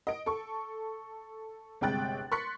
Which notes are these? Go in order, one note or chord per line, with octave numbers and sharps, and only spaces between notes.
D#5 D7
A4 C#6
G1 C3 G#3 G5 F#6 A6
C6 C#6 F#6 A6 B6 C#7